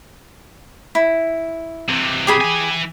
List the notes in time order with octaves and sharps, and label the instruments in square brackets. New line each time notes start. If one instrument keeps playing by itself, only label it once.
[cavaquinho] E4
[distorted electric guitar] C3 E3
[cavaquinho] G4 G#4 B5
[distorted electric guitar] E3 G#5